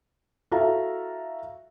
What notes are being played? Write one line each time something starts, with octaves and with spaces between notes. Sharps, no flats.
E4 F#4 A4 E5 F5 A#5